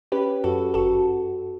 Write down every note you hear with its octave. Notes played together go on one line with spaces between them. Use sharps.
C#4 G4 B4
F#2 F#4 A4
G1 F#4 A4